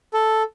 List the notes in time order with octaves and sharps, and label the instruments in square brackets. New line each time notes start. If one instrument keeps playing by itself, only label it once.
[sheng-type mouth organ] A4